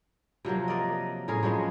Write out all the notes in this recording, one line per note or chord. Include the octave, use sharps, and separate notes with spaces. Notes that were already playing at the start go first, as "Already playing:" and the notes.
C3 F3 F#3 A#3
A#4 D5 D#5
A2 C#4 G#4 A#4
F3 F#3 G#3 B3